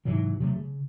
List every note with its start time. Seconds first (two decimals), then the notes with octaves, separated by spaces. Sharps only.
0.05 G#2 C3 E3 F#3
0.40 C3 F#3 G3 A3
0.56 C#3